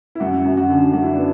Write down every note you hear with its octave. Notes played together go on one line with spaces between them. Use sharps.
E4
F#2 F#4
F#2
F#4
D3
F#2 F#4
E4
B3 D4